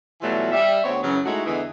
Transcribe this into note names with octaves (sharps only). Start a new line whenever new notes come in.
B2 E3 F#3 G3 A3 F4
G3 E5
D2 B3 C4 C#5
F#2 C#3 E3 F#3
G#3 A3 D#4 E4 F#4
E2 D3 E3 G#3 E4 D#5